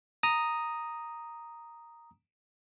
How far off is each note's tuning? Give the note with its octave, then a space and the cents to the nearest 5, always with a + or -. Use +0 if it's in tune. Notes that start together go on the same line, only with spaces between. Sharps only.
A#5 +0 D#6 +0